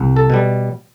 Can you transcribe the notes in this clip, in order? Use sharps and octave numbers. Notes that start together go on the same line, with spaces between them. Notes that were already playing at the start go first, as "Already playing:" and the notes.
Already playing: C2
A4
B2 G3